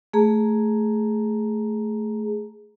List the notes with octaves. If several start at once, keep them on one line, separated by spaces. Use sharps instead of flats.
A3 G#4 A#5